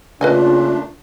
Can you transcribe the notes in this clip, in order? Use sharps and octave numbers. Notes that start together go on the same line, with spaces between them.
A#2 C#3 A3 D4 F4 B4 D#5 G#5